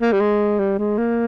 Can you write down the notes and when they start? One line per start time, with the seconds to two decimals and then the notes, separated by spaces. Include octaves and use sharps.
0.01 A#3
0.13 G3
0.20 G#3
0.59 G3
0.79 G#3
0.98 A#3